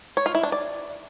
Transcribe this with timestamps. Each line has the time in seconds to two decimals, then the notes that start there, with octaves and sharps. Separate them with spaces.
0.17 C#5
0.26 F4
0.35 E4
0.43 D4
0.52 D5